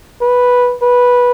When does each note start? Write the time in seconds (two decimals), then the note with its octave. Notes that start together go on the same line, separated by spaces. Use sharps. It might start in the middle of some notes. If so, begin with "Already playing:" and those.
0.21 B4
0.82 B4